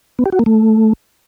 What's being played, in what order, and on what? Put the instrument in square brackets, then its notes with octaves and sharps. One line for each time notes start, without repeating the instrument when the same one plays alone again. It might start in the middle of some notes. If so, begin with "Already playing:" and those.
[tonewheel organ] B3
G4
F#4
A#3
A3